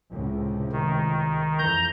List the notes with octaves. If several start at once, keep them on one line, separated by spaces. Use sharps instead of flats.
C#2 A2 C3
D#3
F2 E3 A#5 G6